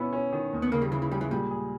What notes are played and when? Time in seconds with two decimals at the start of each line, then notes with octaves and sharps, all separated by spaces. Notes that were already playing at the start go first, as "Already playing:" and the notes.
Already playing: B2 B3 C#4 E4
0.13 C#4
0.33 D#3
0.53 D#2
0.62 B3
0.72 C#3 A#3
0.82 G3
0.91 C#3 E3
1.02 E3
1.11 G3 G#3
1.21 E3
1.30 A#2 G3
1.51 G#4